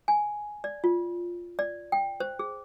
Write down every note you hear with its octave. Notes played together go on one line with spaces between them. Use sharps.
G#5
D5
F4
D5
G5
C5
G#4